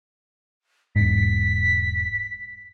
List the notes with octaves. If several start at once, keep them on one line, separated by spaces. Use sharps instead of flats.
E1 G#2 B6